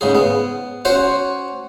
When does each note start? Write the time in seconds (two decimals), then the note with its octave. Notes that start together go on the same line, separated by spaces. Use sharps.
0.01 G#2 C#3 G#4
0.15 B3
0.85 C#4 F#4 C5 C#5 F#5